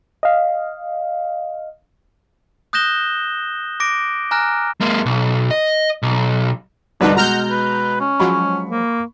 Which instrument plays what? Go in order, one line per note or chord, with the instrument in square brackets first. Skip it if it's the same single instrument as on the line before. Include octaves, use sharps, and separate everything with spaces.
[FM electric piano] D#5 F5
[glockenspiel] D#6 F#6 G6 A#6 E7 G7
D6 A#6 D7
G#5 A#5 F6 F#6 A#6
[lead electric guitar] G#3 A#3
B1
D#5
B1
[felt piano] C2 G2 D3 [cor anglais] D4 [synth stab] D#4 F#4 B4
[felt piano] B2 G#3 [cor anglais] F#5 [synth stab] A#5 F6 G6
[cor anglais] B4
C#4
[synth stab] F3 F#3 G#3 [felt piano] B5 C#6
[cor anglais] A#3